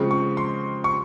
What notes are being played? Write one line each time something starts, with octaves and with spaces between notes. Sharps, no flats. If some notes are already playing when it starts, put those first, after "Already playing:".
Already playing: C#3 F3 G#3 C4 C#6
C#6
C6
C#6